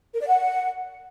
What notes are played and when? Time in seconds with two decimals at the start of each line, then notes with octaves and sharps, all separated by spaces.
0.14 A#4
0.20 D5
0.27 F#5